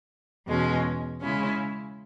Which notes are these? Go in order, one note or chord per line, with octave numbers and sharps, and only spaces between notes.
E2 B2 G#3 C#4
C#3 G#3 C#4 E4